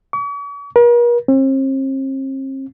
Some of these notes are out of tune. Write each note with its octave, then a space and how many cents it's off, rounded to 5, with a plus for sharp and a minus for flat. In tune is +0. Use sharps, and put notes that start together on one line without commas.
C#6 +45
A#4 +45
C4 +40